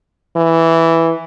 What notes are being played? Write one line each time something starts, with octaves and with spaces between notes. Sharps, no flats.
E3